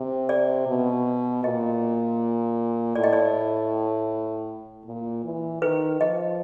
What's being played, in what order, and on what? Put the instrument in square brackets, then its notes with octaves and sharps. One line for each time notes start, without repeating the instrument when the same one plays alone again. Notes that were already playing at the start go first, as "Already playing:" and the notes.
Already playing: [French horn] C3
[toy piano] D5
[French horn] B2
[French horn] A#2 [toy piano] D#5
[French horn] A2 [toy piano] D5
[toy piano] D#5
D5
[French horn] A#2
E3
[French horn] D#3 [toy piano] B4
[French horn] F3 [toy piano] D#5